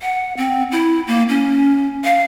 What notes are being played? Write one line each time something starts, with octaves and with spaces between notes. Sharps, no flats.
F#5
C4
E4
A#3
C#4
F5